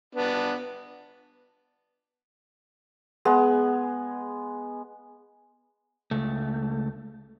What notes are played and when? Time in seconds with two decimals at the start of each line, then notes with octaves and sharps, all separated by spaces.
0.15 B3 D4
3.25 G#3 B3
6.11 C#2 A3